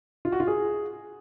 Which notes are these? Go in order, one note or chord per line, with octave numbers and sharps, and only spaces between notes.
F4
F#4
F4
G#4